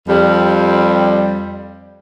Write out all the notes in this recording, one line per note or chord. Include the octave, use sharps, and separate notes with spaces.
F2 G3